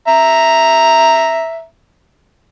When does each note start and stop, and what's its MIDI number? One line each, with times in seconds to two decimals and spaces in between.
0.08 1.64 76
0.08 1.64 82